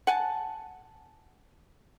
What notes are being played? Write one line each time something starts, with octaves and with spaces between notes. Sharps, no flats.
F#5 G#5 A5